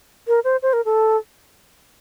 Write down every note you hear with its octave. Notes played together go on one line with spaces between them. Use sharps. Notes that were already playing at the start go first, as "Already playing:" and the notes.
A#4
C5
C5
A#4
A4